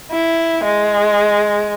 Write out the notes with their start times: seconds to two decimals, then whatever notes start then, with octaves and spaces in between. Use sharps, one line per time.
0.11 E4
0.64 G#3